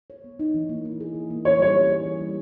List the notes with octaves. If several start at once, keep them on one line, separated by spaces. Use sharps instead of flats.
C#5
B3
D#4
E3
A#3
E4
G#4
E3
A#3
E3 C#5
G3 C#5
C#4
G#4
E3
G3